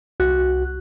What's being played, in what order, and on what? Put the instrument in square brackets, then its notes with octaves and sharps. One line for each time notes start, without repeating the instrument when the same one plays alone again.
[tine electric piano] C2 F#4 F#6